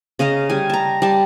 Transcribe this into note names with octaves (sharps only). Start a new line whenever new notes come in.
C#3 D#5 F5 A#5
G3 G#5
A5 A#5
G3 A5